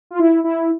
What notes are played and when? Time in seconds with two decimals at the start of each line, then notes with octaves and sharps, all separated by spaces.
0.11 F4
0.19 E4
0.44 E4